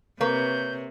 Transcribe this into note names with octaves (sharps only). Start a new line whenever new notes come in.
C3 A#3 B4 C#5 G6